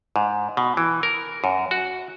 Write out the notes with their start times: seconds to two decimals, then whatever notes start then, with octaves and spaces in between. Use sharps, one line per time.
0.16 G#2
0.57 B2
0.77 E3
1.03 A#4
1.44 F#2
1.71 F#4